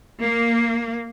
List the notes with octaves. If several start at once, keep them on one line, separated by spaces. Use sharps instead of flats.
A#3